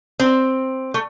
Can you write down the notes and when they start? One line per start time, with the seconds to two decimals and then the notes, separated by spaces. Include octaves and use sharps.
0.20 C4
0.94 A3